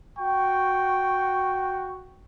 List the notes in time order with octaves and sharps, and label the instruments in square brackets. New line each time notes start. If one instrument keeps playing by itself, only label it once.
[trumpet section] F#4 G5 C#6